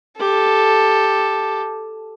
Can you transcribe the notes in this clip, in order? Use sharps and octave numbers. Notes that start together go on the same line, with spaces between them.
G4 A4